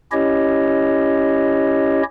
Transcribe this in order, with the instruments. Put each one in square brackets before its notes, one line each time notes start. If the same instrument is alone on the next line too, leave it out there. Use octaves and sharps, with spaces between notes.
[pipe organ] C#4 E4 G4 C#5 D#5